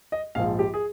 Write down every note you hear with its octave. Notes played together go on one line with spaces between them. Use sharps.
D#5
A#1 G#2 F3 F5
G4
G#4